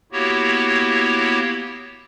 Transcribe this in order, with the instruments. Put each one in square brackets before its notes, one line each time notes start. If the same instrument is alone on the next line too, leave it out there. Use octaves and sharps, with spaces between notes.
[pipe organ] A#3 B3 E4 F#4 G4 C#5